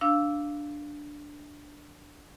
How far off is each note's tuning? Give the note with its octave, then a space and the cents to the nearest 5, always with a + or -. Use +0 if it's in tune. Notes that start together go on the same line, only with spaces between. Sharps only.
D4 +0 F5 -5 E6 +0